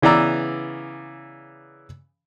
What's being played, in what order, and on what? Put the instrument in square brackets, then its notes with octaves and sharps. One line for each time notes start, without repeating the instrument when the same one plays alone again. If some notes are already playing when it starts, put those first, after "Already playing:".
[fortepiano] C#3 E3 B3 D5 A#5 E6